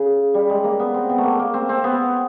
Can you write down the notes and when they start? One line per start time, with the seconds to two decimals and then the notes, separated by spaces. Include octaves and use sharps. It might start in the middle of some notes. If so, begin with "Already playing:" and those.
Already playing: C#3
0.34 G3
0.50 G#3
0.64 A#3
0.79 B3
0.94 C4
1.09 B3
1.18 A3
1.24 A#3
1.39 A#3
1.54 C4
1.69 C4
1.84 B3